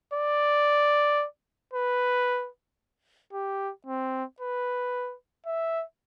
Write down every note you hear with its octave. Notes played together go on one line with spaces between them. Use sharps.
D5
B4
G4
C4
B4
E5